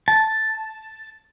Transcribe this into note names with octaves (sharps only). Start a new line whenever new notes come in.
A5